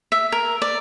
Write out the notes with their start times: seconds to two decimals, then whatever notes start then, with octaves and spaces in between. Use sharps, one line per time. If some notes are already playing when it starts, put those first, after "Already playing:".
0.12 E5
0.32 A#4
0.62 D5